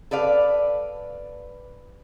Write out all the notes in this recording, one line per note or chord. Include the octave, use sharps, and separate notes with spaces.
A4 B4 D5 F5